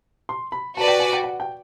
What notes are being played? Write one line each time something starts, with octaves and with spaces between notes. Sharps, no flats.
C6
B5
F#4 B4 D5 A5
G5
G#5
G5
F#5
G5